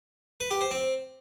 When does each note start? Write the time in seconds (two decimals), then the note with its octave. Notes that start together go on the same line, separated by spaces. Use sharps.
0.40 B4
0.51 G4
0.61 C5
0.71 C4